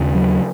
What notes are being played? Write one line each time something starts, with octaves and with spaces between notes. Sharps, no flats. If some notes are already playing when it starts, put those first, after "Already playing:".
Already playing: D#2 C#3
F#3